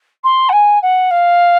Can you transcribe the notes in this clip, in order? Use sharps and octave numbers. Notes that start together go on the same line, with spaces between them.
C6
F#5
G#5
F#5
F5